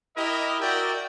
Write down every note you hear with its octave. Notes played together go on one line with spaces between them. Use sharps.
E4 G4 A#4 D#5
F#4 A#4 D5 E5 G5